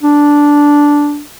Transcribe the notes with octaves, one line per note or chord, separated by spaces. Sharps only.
D4